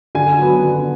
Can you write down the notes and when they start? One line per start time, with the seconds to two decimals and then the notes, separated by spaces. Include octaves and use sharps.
0.15 D3 G#5
0.39 F#3 B3
0.63 D3